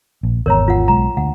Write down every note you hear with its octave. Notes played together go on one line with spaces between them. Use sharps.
A#1
G#1 E2 A#4 C#5 A#5
F4 F#5
B1 G#3 A#5
D2 F#5